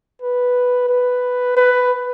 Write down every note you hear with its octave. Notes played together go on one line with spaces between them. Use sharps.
B4
B4
B4